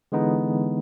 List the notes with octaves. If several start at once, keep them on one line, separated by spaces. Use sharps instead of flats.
D3 E3 G#3 B3 D#4